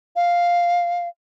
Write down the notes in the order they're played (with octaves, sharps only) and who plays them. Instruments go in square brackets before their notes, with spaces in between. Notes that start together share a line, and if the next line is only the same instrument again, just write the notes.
[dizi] F5